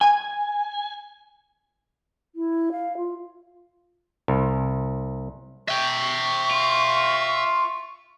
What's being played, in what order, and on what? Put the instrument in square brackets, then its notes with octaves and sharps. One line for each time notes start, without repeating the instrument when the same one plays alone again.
[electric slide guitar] G#5
[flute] E4
F5
F4
[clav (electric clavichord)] C2
[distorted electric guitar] E5 G5 [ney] C#6
[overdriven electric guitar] F4